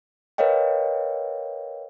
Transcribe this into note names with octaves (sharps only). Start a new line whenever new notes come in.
A#4 B4 C#5 D#5 F5 G5